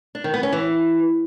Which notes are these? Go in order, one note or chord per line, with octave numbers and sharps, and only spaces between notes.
D4
D#3
B3
C#4
E3